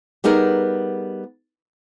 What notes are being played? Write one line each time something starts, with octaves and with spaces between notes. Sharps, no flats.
G3 B3 D#4 G#4 A#4